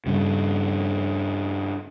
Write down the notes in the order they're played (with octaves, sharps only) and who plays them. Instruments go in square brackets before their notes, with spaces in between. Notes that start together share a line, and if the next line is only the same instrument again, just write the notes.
[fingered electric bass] G2 C#3